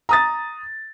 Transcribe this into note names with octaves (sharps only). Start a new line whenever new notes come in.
A#5 D#6 A6